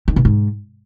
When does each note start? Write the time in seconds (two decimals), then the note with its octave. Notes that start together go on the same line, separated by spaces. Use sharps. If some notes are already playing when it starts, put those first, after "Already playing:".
0.08 D#3
0.16 B2
0.25 G#2